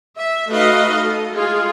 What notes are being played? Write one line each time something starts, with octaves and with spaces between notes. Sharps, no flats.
E5
A3 D#4 F#4 B4 D#5 F5
A4
G#3 F4 G#4